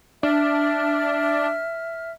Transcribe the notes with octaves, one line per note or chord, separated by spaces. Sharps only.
D4 E5 F6